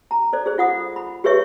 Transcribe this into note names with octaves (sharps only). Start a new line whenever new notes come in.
A#5
A4 C5 D5
G#4 C5
F4 F#5 D#6
B5
G4 G#4 B4 C#5 E5 C#6